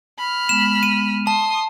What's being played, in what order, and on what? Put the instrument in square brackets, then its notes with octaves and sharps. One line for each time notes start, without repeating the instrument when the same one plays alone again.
[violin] B5 F6
[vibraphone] G#3 B3 [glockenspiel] E7
[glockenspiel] D#7
[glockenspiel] A5 [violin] C6 D#6